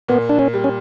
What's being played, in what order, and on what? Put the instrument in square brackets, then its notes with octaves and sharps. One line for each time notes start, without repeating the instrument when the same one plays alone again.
[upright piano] A#2 [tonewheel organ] B3
[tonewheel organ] D4
C#4
[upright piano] G3
[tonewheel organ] C#4